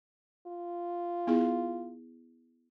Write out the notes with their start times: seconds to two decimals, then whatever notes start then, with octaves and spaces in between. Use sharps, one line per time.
0.47 F4
1.27 B3 E4 G#4